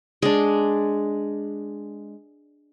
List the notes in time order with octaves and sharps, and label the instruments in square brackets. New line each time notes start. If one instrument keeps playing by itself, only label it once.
[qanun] G#3 D4